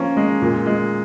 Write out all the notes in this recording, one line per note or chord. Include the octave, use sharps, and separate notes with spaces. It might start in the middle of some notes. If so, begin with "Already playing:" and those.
Already playing: F3 A#3 C#4
G#3
A#2
G#3